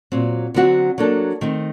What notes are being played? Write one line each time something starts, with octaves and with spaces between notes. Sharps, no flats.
A#2 F#3 C4
D3 F#3 C4 F#4
F#3 A#3 D4 A4
D#3 A3 C4 D#4